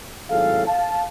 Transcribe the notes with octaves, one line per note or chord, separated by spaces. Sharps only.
G#1 A2 F#3 G#4 A4 F5
F5 A5